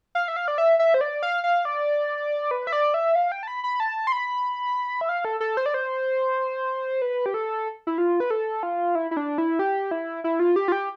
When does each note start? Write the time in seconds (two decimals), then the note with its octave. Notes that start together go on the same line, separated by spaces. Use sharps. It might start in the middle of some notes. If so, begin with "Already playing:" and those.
0.15 F5
0.28 E5
0.36 F5
0.48 D5
0.58 E5
0.79 E5
0.94 C5
1.01 D5
1.23 F5
1.44 F5
1.65 D5
2.51 B4
2.67 E5
2.72 D5
2.94 E5
3.15 F5
3.32 G5
3.43 A5
3.48 B5
3.64 B5
3.80 A5
4.07 C6
4.12 B5
5.01 E5
5.09 F5
5.25 A4
5.40 A4
5.57 C5
5.66 D5
5.74 C5
7.02 B4
7.26 G4
7.34 A4
7.87 E4
7.98 F4
8.20 B4
8.31 A4
8.63 F4
8.95 E4
9.11 E4
9.17 D4
9.38 E4
9.59 G4
9.91 E4
10.24 E4
10.40 F4
10.56 G4
10.68 F4
10.72 G4